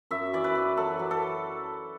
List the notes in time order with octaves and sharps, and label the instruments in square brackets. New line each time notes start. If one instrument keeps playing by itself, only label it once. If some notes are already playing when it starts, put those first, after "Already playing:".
[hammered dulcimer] F#2 E5
E3 D5
B4
E3
F#3 A4
F#3
A4